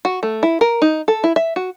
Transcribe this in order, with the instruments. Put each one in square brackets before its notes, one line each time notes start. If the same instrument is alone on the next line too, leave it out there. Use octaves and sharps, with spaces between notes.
[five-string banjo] F#4
A3
E4
A#4
D#4
A4
E4
E5
F#4